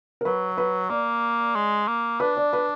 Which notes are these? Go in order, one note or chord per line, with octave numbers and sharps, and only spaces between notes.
A#4
F#3 B4
B4
A#3 D5
G#3
A#3
D4 B4
D5
B4